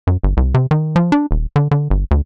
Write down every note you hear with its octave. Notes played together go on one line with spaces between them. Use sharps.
F#2
G1
C2
C3
D#3
F3
D4
D#1
D3
D3
G1
D2